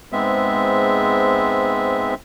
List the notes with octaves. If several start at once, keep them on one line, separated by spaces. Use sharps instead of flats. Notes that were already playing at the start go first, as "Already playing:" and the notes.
G#2 G#3 B3 C4 E5